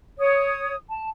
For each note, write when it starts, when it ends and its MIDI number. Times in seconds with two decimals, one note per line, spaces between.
0.18 0.75 73
0.18 0.75 87
0.89 1.09 81